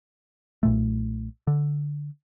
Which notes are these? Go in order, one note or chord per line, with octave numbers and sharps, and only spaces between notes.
B1 A#2 A3
D3